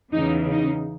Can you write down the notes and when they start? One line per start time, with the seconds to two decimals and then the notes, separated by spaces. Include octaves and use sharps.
0.12 E2 C#3 E3 D#4
0.50 D#4